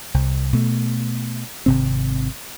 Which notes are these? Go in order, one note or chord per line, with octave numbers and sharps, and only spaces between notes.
C2
B2 A3
G#1 C3 C4